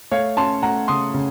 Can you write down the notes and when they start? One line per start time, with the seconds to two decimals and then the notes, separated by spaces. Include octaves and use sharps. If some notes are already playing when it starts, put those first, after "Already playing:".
0.11 A3 C#5 F5
0.37 C#4 A5 C6
0.62 A3 F#5 A#5
0.88 C#3 C6 D#6
1.14 C#3